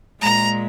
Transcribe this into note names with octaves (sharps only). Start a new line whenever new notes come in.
A#2 G#3 A#5